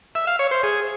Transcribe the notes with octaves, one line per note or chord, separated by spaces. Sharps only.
E5
F5
C#5
C5
G#4